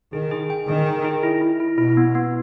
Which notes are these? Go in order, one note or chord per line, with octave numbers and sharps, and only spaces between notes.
D#3 G#4
G#4
G5
D#3 G#4
G5
G#4
E4
E4
E4
B2 E4
B3
B3